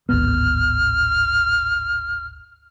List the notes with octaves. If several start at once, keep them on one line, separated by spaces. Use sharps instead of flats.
D1 G#1 B3 F6